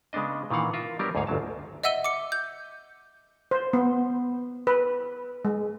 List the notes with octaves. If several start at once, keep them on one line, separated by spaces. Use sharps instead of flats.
C#3 G#3 B3 D4 D#5
A#2 D#3 E3 F5 F#5
F4 A#4 E5
F#3 G3 B3 D4 G4 A#4
D2 G#2 G#4 C#5 F5
G1 D2 F#3 A5
D#5 E5 F#5 E6 D#7 G7
D6 C#7
G6
C5
B3
B4
G#3